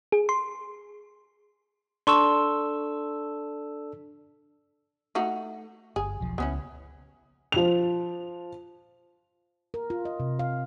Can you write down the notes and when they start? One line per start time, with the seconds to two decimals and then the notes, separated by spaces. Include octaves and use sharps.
0.12 G#4
0.29 C6
2.07 D4 A4 C6 C#6 E6
5.15 A3 D#4 F#4
5.96 G1 G#4
6.20 E1 B1 F3
6.38 C#2 B3 C#4 E4
7.52 F3 F7
9.74 A#4
9.90 F4
10.05 D#5
10.20 C3
10.39 F5